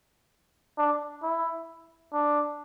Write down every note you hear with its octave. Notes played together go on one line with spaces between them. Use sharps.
D4
E4
D4